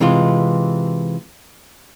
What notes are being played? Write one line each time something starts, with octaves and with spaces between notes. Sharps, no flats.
C3 E3 G#3 F4